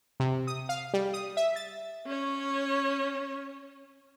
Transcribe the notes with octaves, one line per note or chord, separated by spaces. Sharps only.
C3
D#6
F5
G3
D#6
E5
A6
C#4 C#5